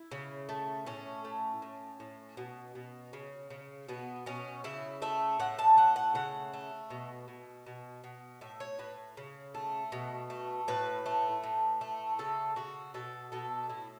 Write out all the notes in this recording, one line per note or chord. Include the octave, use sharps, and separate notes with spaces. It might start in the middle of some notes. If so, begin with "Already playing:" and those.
Already playing: E4
C#3
A3
A2 C#4
A3
A2
A2
B2
B2
C#3
C#3
B2 B3
B2 C#4
C#3 E4
A3 E5
A2 F#5
A5
A3 F#5
F#5
C#3 F#5
A3
B2
B2
B2
B2
A2 E5
C#5
A2 B4
C#3
A3
B2
A3
A2 B4
A3
A2
A3
C#3 A4
C#3 F#4
B2 A4
B2 A4
A2 E4